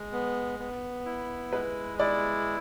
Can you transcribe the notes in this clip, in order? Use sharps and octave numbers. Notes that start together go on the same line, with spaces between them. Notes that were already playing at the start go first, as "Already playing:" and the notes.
Already playing: G#3
B3
B3
E4
G#3 B4
E4 D5